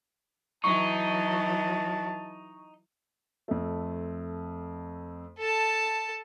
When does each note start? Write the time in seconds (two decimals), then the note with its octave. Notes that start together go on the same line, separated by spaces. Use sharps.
0.64 E3 F#3 D#4 A5 C#6
3.48 F2 A3
5.39 A4 A5